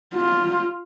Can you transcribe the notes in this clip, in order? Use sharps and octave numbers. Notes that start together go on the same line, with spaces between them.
F4